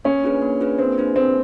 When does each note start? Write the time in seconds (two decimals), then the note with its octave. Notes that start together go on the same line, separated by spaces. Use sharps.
0.05 A#3 C#4
0.24 D4 F4 G#4 B4
0.42 A#3
0.61 D4 F4 G#4 B4
0.78 A#3 C4
0.98 D4 F4 G#4 B4
1.16 A#3 C4